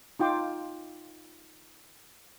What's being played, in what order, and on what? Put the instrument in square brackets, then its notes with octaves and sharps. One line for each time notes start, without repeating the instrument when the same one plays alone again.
[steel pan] D#4 F4 G5 C6 D6